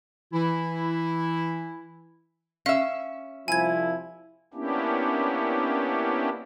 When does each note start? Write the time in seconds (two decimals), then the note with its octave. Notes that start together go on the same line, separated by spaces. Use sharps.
0.33 E3 E4
2.66 C#4 E5 F5
3.48 C2 F3 E4 G#5 G#6
4.54 A#3 B3 C#4 D4 E4 G4